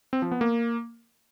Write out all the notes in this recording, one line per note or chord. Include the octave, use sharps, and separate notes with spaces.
C4
F3
B3
A#3